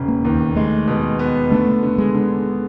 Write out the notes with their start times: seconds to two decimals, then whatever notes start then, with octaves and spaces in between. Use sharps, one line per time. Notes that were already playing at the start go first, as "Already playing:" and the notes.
Already playing: E1 C#3
0.08 A#3
0.25 D#2
0.56 G#3 A3
0.87 B2
1.19 B3
1.51 D3 A3
1.83 D3
1.98 G#3
2.14 D3